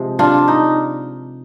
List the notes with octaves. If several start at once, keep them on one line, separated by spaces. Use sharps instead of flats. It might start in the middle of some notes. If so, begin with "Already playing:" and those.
Already playing: C3 F3 G#3
D4 F4
D#4